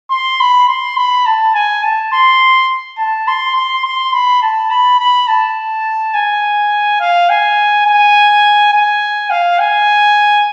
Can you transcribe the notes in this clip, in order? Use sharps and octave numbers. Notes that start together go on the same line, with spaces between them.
C6
B5
C6
B5
A5
G#5
A5
C6
A5
C6
C6
C6
B5
A5
B5
B5
A5
G#5
F5
G#5
G#5
G#5
F5
G#5